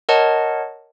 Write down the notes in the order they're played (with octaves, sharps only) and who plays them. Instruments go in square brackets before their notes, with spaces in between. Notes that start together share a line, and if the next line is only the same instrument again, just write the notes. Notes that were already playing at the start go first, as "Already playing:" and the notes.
[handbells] A#4 C#5 D#5 F#5 A5